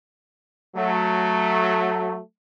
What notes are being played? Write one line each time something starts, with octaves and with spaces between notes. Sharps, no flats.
F#3 A3